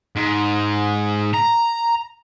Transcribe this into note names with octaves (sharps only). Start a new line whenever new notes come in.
G#2
A#5